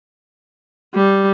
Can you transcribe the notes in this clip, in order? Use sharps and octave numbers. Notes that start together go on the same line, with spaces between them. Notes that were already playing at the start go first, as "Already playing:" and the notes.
G3